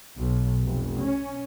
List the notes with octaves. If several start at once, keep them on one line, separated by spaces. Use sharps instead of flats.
B1
F1
C#4